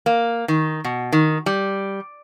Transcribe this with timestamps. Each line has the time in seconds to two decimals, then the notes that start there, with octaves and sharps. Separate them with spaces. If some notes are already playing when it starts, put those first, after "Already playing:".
0.06 A#3
0.48 D#3
0.84 B2
1.12 D#3
1.46 G3